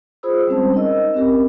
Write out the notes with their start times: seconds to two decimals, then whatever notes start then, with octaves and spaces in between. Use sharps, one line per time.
0.23 F4 G#4 C5 B5 D#6 E6
0.47 G3 G#3 C4 C#4 C5 A5
0.74 D#4 A#4 D#5 E6
1.14 C4 C#4 G4 A#4